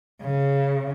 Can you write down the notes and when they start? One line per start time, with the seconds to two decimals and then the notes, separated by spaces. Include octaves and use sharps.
0.22 C#3